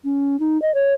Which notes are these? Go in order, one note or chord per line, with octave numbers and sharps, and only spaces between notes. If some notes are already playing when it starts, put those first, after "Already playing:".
C#4
D#4
D#5
C#5